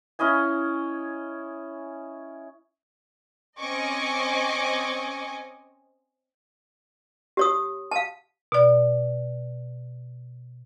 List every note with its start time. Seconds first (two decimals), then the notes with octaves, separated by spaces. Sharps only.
0.19 C#4 E4 D#5 G#5
3.59 C4 C#4 D#5 G#5 C#6 D6
7.37 G4 C#5 D#6
7.91 F5 A5
8.52 B2 D5